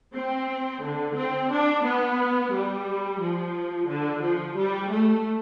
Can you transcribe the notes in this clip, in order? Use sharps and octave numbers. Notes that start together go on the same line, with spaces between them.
C4
D3
C4
D4
B3
G3
F3
D3
F3
G3
A3